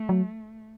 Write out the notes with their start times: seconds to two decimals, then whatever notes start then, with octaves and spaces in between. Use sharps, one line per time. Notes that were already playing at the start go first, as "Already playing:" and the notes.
Already playing: A3
0.09 F#3